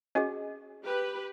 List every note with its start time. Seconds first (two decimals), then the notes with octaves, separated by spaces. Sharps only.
0.15 C#4 F#4 G#4 D#5 G#5
0.82 G4 B4